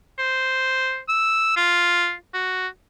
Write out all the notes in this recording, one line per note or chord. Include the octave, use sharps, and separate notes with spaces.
C5
E6
F4
F#4